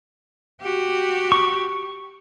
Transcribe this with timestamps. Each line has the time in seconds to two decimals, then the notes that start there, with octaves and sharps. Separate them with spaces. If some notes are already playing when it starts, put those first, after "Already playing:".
0.61 F#4 G4
1.32 C#6